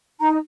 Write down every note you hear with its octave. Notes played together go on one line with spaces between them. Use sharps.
D#4 A#5